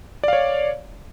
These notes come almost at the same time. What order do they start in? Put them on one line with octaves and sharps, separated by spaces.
D5 F5 C#5